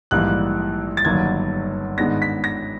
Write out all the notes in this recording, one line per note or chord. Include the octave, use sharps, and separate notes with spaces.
A#1 G#2 E3 G3 A#3 F#6
A6
G1 G2 D#3 F#3 A#3 G#6
G#2 D#3 G#3 B3 D4 A#6
B6
A#6